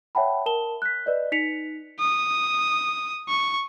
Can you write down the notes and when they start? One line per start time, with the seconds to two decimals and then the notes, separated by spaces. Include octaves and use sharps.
0.15 C#5 E5 F#5 G5 A5 B5
0.46 A#4 A5 E7 G7
0.82 F#6 B6
1.06 B4 D5 D#5
1.32 D#4 B6 C#7 F7
2.00 D#6
3.29 C#6